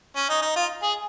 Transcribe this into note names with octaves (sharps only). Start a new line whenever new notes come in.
C#4
D#4
D#4
F4
G#4